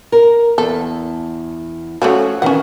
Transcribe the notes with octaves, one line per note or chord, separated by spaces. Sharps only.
A#4
E2 A4
F3 F#3 A3 C#4 F#4
D#3 E3 C#4 F#5